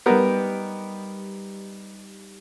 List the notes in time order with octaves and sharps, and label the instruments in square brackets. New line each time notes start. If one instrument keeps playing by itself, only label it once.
[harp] G3 D#4 G4 [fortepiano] B3 A#4